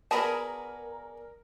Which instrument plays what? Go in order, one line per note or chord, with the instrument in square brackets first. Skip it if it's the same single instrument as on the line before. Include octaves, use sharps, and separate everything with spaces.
[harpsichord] B3 D4 F#4 [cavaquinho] G#4 B5 D#6 [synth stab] A#4 [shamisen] A5